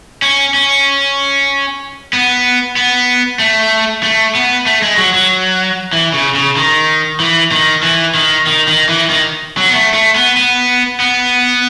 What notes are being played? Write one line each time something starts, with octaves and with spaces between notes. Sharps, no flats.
C#4
C#4
B3
B3
A3
A3
B3
A3
G#3
F#3
F#3
E3
C#3
C#3
D#3
E3
D#3
E3
D#3
D#3
D#3
E3
D#3
F#3
B3
A3
A3
B3
B3
B3